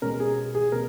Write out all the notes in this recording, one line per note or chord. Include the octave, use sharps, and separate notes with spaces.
B2 G#3 C#4 A#4
G#4
G#4
B2 A#4